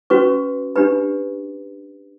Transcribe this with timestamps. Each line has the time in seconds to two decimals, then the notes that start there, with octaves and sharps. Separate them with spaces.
0.10 C#4 F#4 B4 C#6
0.76 D4 G4 B4 B5